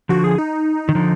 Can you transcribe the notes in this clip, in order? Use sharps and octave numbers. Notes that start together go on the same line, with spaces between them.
D3 F3 F#4
G#4
D#4
D#3
D3 F3